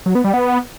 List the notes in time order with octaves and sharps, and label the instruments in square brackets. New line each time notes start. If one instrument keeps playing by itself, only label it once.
[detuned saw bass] F#3
B3
G3
B3